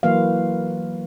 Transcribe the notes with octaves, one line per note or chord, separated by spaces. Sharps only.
E3 F#3 A#3 B4 F5